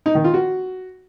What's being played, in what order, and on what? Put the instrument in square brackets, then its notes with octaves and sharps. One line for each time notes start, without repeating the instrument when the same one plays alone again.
[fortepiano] D#4
D#3
F4
F#4